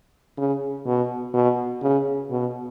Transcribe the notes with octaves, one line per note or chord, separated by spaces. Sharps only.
C#3
B2
B2
C#3
B2